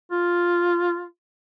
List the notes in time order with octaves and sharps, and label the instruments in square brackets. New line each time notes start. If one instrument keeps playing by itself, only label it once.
[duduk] F4